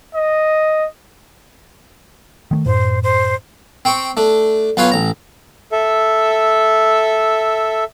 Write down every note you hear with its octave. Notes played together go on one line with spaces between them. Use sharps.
D#5
D#3 G#3 A3
F#2 A2 C5
C5
C4 G5 C#6
A3 D4
B1 F4 B4 C#5 F5
A1 A#5
A4 E5